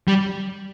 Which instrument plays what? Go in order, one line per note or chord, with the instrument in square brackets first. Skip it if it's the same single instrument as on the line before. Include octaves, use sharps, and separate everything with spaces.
[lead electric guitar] G3